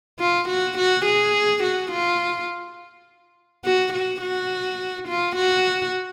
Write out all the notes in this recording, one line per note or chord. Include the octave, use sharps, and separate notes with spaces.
F4
F#4
F#4
G#4
F#4
F4
F#4
F#4
F#4
F4
F#4